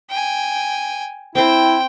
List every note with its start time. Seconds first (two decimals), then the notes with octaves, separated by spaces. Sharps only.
0.10 G5 G#5
1.35 C4 E4 C5 G5